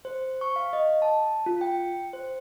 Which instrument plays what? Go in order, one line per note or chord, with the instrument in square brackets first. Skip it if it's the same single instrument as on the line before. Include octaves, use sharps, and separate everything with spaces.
[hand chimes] C5
C#6
F5
D#5
A5
F4
G5
C5